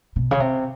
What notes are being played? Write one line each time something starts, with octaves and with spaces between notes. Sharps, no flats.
B2
C#3
C3